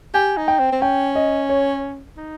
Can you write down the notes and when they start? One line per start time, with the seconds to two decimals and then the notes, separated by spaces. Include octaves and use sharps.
0.14 G4 G#5
0.37 D#4
0.48 G5
0.59 C4
0.72 C4
0.82 C#4 G5
1.16 D#5
1.49 C#5
2.17 D#4